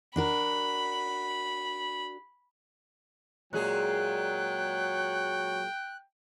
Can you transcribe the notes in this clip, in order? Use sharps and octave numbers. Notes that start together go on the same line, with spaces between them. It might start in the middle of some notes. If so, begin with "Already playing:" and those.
D4 F#4 A#4 B5
A#2 F#3 G#3 G#4 G5 F#6